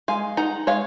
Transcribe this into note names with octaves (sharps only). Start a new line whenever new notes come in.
G#3 F5 G#5
D#4 F#5 A#5
G#3 C#5 F5